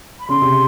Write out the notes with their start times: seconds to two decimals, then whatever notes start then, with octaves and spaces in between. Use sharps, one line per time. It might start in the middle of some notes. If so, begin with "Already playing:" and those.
0.20 B5
0.29 C#3 C6
0.42 C3